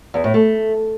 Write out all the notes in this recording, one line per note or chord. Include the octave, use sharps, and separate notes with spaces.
E2
A2
A3